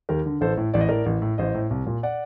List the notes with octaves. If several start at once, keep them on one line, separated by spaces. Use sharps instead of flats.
D#2 G4 A#4
D3
A1 A4 C5
A2
A1 D5
D#5
A2 A#4 D5
A1
A2
A1 C5 D#5
A2
C2
A#2
D5 F#5